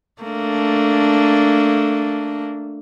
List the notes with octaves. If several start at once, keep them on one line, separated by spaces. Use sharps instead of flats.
A3 A#3 D4